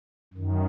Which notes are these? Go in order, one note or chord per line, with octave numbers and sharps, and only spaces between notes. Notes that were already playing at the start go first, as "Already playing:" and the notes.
F#2 D#3